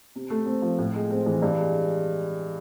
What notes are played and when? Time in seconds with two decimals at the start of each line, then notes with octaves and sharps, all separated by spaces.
0.15 C3
0.30 A3
0.46 C4
0.62 F3
0.78 A2
0.95 G#3
1.11 C4
1.26 E3
1.42 G2
1.58 G#3